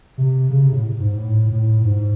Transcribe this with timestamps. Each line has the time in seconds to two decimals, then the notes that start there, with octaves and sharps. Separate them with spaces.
0.18 C3
0.50 C#3
0.62 C3
0.72 A2
1.00 G#2
1.17 A2
1.50 A2
1.84 G#2